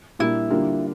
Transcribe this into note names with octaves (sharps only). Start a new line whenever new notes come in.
A#2 G3 A#3 D4 E4
D3 G3 A#3 D4 F4